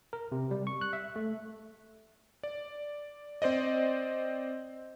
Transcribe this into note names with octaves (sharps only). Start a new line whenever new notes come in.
A#4
C3
G3
C#6
F#6
E5
A3
D5
C4 C5 D5 D#5